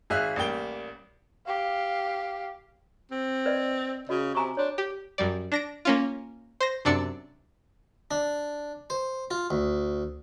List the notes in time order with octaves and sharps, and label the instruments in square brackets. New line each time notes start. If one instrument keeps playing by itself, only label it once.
[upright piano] G#1 G#4 E5 F5 F#6
A1 G3 A#3 G5 G7
[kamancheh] G4 F5
[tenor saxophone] C4
[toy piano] B4 D5 D#5
[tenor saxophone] C#3 [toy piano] F#4 D#5
[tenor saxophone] C3 [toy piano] G#5 A#5 C#6
[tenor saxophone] D4 [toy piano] C#5 C6
[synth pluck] G4
F#2 G3 D5
D4 A#6 D7
A#3 C#4 F4
C5 A#6
F#2 C3 D4 D5 E6 C#7
[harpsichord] D4
C5
F4
D2